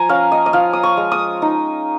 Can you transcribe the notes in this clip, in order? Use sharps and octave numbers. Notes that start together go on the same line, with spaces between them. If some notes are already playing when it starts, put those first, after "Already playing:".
Already playing: F3 G#5 A#5
C#4 F5
D#5
D#5
F3 F5
D#6
C#6
G#3
D#6
D#4